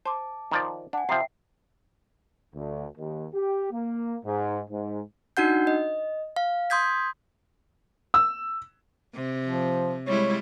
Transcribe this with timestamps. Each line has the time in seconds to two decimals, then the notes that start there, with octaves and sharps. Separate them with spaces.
0.05 C5 A5 D6
0.52 D#3 F3 D5
0.93 D4 F#5 G#5
1.09 C3 F3 E5 G5 C7
2.55 D2
2.98 D#2
3.34 G4
3.72 A#3
4.25 G#2
4.70 G#2
5.37 D4 D#4 F#4 F#5 G6
5.67 D#5
6.36 F5
6.70 C6 D#6 G6 G#6 B6
8.14 E6
9.15 C3
9.44 F3
10.07 G3 G#3 E4 C#5